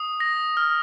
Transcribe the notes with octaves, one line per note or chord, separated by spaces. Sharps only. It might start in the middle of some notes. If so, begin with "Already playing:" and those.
Already playing: D#6
A#6
F6